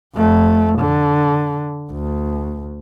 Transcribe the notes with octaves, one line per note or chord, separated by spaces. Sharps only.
F2 A3
D3
D2